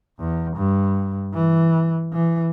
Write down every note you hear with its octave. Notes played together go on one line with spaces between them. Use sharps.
E2
G2
E3
E3